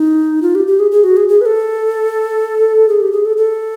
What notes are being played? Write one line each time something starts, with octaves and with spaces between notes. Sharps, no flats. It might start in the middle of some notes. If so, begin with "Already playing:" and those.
Already playing: D#4
F4
G4
G4
G#4
G#4
F#4
G#4
G#4
B4
A4
G#4
G4
G#4
A4
A4